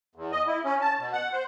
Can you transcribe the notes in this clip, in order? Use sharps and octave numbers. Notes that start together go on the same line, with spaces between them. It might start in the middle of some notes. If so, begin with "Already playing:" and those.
E2
D#5
E4
C#4
A5
B2
F#5
C5